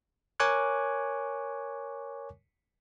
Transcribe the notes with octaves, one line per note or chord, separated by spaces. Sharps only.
A#4 C#5 G#5 C#6 D6 F#6